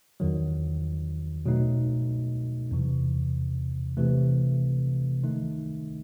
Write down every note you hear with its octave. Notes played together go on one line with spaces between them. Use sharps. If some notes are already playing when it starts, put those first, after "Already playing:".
E2 D#3 F#3
B2 F#3 A3 D#4
E2 C3 E3
C3 E3 A3
D#3 A3 D#4